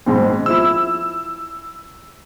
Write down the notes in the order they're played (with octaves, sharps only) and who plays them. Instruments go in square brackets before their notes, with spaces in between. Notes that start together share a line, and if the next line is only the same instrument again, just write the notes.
[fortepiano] G#2 B2 C4
[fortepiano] F3 E4 [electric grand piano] E6